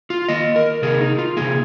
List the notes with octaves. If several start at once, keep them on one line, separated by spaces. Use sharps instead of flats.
F4
D#3 A#3 D#5
A#4
C3 D#3 A#3 G#4
D#4
F4
C3 D#3 A#3 G#4